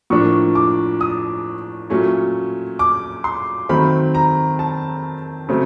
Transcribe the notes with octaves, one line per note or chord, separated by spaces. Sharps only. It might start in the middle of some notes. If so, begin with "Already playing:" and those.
A2 F3 A#3 D4 C#6
D6
D#6
A#2 F#3 A3 C#4
D6
C6
D#3 F#3 A3 C4 B5
A#5
A5
C#3 F#3 A3 C4